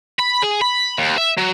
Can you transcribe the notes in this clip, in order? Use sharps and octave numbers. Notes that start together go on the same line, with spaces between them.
B5
G#4
B5
D#2
E5
F#3